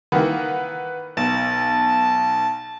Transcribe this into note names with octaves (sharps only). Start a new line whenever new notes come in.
D#3 E3 A#3 B4 F#5
B1 A5